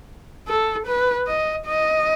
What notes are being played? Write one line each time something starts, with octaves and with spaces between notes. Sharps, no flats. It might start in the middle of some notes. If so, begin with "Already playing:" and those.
A4
B4
D#5
D#5